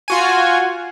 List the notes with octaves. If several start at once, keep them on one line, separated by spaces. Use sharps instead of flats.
F4 F#4 G#5